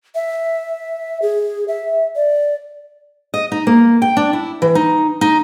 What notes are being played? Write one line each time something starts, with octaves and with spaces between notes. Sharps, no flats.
E5
G#4
E5
D5
D#5
D#4
A#3
G5
D4
E4
E3
D#4
D#4